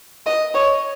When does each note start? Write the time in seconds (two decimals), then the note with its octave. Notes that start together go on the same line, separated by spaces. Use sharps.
0.26 D#5
0.54 C#5